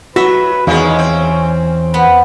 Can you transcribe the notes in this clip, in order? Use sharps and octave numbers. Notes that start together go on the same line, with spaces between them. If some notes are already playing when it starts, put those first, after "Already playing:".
F#3 F#4 B4 E5
E2 D#3 G#3 B3 C#4 F5
C4
B3 B4